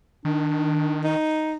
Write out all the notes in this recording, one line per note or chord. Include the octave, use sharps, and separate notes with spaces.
D#3 D4
D#4